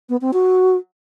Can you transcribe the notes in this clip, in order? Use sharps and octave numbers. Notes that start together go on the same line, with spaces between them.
B3
C4
F#4